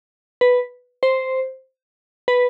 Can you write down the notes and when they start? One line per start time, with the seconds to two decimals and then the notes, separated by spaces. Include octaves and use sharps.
0.41 B4
1.03 C5
2.28 B4